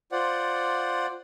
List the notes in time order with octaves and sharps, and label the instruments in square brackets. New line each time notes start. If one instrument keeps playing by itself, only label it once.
[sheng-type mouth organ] F4 C5 D5 F#5